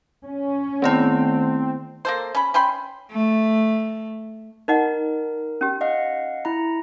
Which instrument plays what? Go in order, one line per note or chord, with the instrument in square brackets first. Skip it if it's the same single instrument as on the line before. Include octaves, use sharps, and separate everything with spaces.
[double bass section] C#4
[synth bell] D#3 A3 E4 [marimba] B3 [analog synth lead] C4
[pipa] A#3 A4 C5
C#4 B5
C#4 G5 B5 C6
[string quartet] A3
[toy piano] D#4 D#5 F#5 [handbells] A#4
[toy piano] C#4 G4
[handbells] D#5 F5 F#5
E4 A#5